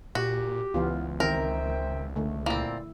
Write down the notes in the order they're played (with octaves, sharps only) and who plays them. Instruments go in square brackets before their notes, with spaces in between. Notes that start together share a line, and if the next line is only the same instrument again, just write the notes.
[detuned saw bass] A#2 [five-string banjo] F#4 [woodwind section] G4
[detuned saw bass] C#2 [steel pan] E3 B3 F4
[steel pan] D#3 C4 [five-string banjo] A#4 [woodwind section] C5 E5 G5
[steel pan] D3 A3
[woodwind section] A#2 D5 [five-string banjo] A#3 C4 [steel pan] E4